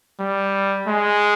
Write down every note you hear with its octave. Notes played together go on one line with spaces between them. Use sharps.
G3
G#3